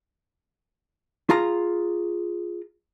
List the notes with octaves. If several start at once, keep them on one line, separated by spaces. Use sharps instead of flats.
F4 G#4 A#5